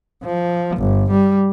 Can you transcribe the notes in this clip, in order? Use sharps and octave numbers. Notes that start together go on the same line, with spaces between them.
F3
G1
G3